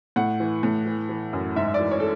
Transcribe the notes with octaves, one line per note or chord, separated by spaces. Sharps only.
A2 F#5
E3
A2
E3
E3
F#2
G#2 E5
E5
D5
E3
C#5
A4